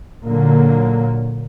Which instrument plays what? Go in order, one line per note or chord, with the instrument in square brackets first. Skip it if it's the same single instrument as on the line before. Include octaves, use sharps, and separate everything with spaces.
[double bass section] A#2 D3 F#3 A#3